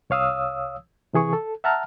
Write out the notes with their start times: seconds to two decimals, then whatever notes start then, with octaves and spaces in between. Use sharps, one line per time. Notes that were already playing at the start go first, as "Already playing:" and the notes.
0.10 C2 C#5 F5 D#6 E6
1.13 C3 E3 G#4 C#6
1.33 A4
1.64 E5 F#5 A5 A#5 F6